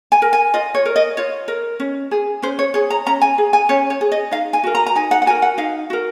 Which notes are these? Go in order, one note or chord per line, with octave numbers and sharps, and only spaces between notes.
G#5
A#4
G#5
F4 D#5
C#5
A#4
D#5
F4 C#5
A#4
C#4
G#4
C#4 C5
C#5
G#4 C#5
A#5
C#4 A#5
G#5
G#4
G#5
C#4 C#5
C#5
G#4
D#5
D#4 F5
G#5
F#4 A#4
A#5
A#5
D#4 G#5
F#5
F#5
F#4 A#4 G#5
F#5
D#4 F5
F#4 A#4